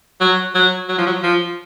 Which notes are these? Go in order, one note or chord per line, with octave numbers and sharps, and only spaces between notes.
F#3
F#3
F#3
F3
F#3
F3